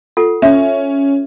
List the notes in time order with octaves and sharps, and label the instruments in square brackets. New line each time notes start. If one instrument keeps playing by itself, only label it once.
[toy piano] F4 A4 F#5
[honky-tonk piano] C#4 [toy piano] E5